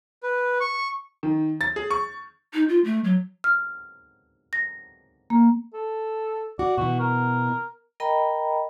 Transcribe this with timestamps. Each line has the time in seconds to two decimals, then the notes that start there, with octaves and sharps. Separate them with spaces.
0.23 B4
0.60 C#6
1.23 D#3
1.61 A6
1.76 G#4
1.91 C#6
2.54 D#4
2.69 F4
2.85 A3
3.04 F#3
3.44 F6
4.53 A#6
5.30 A#3
5.74 A4
6.59 F#4 D5
6.78 B2 E3 F#4
7.00 A#4
8.00 A#4 D#5 G5 A#5 B5